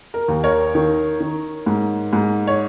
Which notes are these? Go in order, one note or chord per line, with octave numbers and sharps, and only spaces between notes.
A#4
D#2
A#4 C#5
D#3
D#3
G#2
G#2
C#5